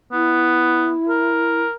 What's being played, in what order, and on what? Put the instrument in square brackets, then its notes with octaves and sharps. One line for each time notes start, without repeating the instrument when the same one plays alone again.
[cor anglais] B3 [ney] E4
[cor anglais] A#4